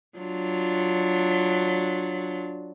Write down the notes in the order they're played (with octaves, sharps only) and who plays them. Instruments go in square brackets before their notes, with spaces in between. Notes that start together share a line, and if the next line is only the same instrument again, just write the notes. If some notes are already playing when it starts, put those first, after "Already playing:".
[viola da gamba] F#3 D4 F4